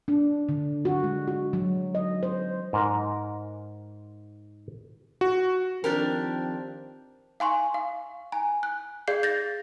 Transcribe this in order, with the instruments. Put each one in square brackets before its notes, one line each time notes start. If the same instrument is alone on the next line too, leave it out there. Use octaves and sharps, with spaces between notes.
[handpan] D4
D3
F#4
G#3
F#4
F#3
D#5
C5
[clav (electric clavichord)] G#2 A#4 A#5
[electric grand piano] F#4
[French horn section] D#3 F3 C4 [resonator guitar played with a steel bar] D4 G4 A#4
[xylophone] F5 G#5 C6 C#6
F5
G#5 A#5
F#6
G#4 D5 F5 G6 C7
G6 A6 A#6